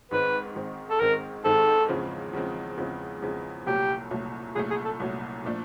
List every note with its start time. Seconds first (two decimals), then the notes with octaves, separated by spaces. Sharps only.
0.11 G#2 D#3 G#3 C4 B4
0.55 G#2 D#3 G#3 C4
0.90 A4
1.00 G#2 D#3 G#3 C4 A#4
1.44 G#2 D#3 G#3 C4 A4
1.89 E2 C#3 F3 G#3 C4
2.33 E2 C#3 F3 G#3 C4
2.77 E2 C#3 F3 G#3 C4
3.22 E2 C#3 F3 G#3 C4
3.66 C2 A#2 F#3 A3 G4
4.11 C2 A#2 F#3 A3
4.55 C2 A#2 F#3 A3 G#4
4.70 G#4
4.85 A4
5.00 C2 A#2 F#3 A3
5.44 A#2 F3 A3 D4